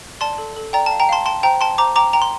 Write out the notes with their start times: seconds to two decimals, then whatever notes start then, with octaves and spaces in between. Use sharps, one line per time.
0.21 D5 A5 C6
0.38 A4
0.56 A4
0.73 D5 G5 A#5
0.86 A5
0.91 F5
1.00 G5 A#5
1.09 F5 A5 C6
1.25 G5 A5 C6
1.43 C5 G5 A#5
1.60 G5 A5 C6
1.78 C5 A#5 D6
1.96 G5 A#5 D6
2.13 G5 A#5
2.22 C6